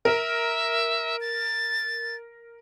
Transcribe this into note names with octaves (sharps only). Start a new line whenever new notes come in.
A#4 E5
A6